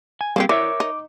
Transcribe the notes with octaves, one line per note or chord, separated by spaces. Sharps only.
G#5
G3 A#3 C4 C#4 G4 G#4
E3 A#4 C#5 D5 E5 D6
D#4